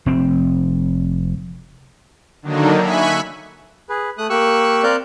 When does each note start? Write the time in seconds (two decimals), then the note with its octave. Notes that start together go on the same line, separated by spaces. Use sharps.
0.06 F1 C4
2.42 D3 D#3 F#3 A#3 D4 D#4
2.81 E5 G#5 B5 C#6 F#6 B6
3.89 G#4 B4
4.18 A3 D#6 F#6
4.30 A#3 G4 C#6 E6 F#6
4.83 C4 A#4 D5 F5 F#6 G6